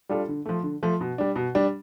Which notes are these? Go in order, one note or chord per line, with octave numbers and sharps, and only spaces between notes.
G3 D4 F4 A4
D3
F3 A3
D3
F3 A3
B2
G3 D4
B2
G3 D4